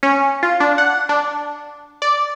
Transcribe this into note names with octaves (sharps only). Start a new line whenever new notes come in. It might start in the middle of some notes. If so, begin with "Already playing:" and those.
C#4
F4
D4
F#5
D4
D5